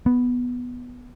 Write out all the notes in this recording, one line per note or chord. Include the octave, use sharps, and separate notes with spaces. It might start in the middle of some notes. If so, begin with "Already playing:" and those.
B3